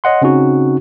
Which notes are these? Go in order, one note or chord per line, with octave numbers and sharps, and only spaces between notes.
C#5 D#5 F#5 C6
C#3 C4 C#4 D#4 F#4